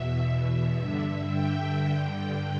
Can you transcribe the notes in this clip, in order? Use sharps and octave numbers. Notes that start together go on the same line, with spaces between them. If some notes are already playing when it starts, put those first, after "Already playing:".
Already playing: E2 B2 E5
E5
G2 D3 E5
G5
G2 D3 G5